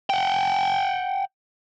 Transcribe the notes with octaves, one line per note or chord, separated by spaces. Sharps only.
F#5 G5